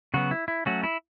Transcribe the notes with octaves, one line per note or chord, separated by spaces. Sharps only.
C#3 F#3 B3 F#4
E4
E4
F#3 A3 C#4 F#4
E4